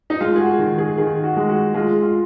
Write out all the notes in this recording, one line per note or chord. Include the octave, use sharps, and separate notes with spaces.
D#4
G#3 F4
G#4
F#4
D#3
G#4
D#3 G#4
F#4
G#3
F#4
G#3 F4
F4